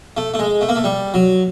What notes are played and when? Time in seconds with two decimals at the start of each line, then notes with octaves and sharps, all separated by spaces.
0.17 A3
0.34 A3
0.39 G#3
0.61 A3
0.69 A#3
0.76 A3
0.84 G3
1.14 F#3